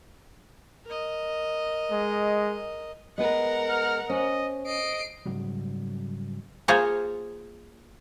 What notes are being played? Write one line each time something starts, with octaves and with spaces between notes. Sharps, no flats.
A#4 D#5
G#3
G#3 B3 A#4 B4 D#5 F#5
F6
C#4 C5 D#5
D#5 C7 D7
G#2 C#3 F#3 G3
A#3 F4 G#4 C5 C#5 A#5